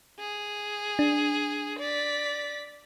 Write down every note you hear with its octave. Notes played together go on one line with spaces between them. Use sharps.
G#4
D4
D5 B6